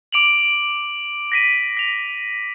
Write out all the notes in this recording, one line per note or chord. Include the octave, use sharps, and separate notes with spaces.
D6 D7 F7 F#7
A#6 B6 D#7
B6 F7